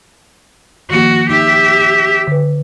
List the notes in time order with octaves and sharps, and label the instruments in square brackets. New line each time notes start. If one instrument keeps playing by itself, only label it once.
[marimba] D#3 F3 A#3 [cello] F#4
[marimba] D#4 [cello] G4 E5
[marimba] D3 B4